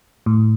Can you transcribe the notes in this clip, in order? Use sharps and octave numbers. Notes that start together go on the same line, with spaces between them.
A2